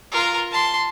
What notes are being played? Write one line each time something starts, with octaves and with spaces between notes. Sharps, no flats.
F4 A#4
A5 C6